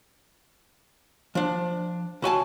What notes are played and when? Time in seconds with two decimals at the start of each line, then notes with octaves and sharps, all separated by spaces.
1.35 F3 D4
2.22 C#2 F#4 G#5 A5